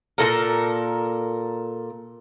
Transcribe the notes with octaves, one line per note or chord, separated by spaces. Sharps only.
A#2 F3 A4 A#4